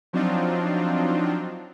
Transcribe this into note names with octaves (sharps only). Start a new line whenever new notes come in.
F3 F#3 C4 D4 D#4 F4